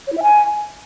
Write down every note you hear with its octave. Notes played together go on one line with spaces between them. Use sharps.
C#5
E4
E5
G#5